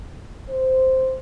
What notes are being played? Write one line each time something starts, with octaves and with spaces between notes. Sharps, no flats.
C5